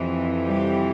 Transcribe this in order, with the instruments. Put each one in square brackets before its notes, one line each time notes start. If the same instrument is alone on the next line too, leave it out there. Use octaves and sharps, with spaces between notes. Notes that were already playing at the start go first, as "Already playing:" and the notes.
Already playing: [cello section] F2 C3 E3
G3 G4